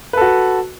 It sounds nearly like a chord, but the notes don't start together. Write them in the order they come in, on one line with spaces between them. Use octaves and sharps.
B4 A4 F#4